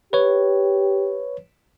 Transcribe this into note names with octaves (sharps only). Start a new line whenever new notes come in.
G4 B4 C#5